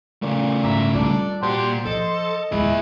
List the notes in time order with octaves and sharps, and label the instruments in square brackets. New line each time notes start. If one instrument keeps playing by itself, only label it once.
[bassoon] A#2 [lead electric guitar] C#3 A3
[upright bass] G#2 [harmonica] E5 A#5
[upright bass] G3 F4 [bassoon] D4 [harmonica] A4 D5
[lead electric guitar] A#2 D5 [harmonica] F#4 G4 C6 [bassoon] C5
[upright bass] F3 [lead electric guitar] A4 [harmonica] D#5
[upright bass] D#1 G#3 [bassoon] E4 [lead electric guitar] G#4 E5